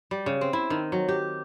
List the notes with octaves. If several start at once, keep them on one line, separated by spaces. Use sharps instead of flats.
G3
C#3
C4
E4
D#3
F#3
G4